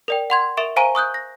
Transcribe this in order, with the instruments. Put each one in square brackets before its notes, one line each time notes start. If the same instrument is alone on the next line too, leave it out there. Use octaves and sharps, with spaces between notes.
[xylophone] A#4 D5 G5
F#5 C6 G#6
A#4 E5 C#6 D7 E7
C5 F5 G#5 A#5 C#6 D#7
C#6 D#6 F#6 G6
A#6